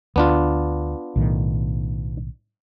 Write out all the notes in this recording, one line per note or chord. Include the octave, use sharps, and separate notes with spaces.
D2 B3 D4 F4
B1 A2 D#3